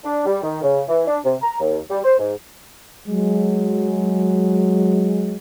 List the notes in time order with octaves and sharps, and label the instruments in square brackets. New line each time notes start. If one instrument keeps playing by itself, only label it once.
[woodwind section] D4
G3
D#3
C#3
E3
D4
C3
A#5
D#2
G3
C5
G#2
[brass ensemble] F#3 G#3